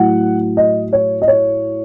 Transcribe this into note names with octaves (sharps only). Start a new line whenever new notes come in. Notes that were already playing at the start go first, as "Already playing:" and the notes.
Already playing: A2 F#3 F#5
D#5
C#5
D#5
C#5